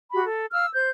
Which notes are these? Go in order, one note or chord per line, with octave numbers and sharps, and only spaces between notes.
F#4 G4 B5
A4
F5 E6 F6
C5 G6